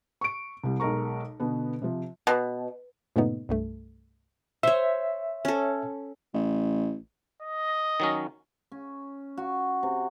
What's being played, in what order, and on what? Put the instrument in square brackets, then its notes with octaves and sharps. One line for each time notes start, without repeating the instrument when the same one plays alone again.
[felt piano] C#6 D7
C2 G3
B1 G#3 A#4 A#5 C#6
B2 D3 B3
C3 F3
[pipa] B2
[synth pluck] G2 A#2 C#3 A3 B3 D#4
C2 G2 A3
[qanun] C5 C#5 [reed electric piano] E5
[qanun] C#4 A4
[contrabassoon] A1
[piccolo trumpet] D#5
[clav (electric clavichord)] D#3 F#3 C#4
[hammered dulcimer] C#4
F#4
C3